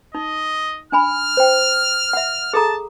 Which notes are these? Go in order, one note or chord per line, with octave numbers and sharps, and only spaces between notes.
D#4 D#5
D4 G#5 B5 F6
C5 G5
E5 F#5
G#4 A4 A5 A#5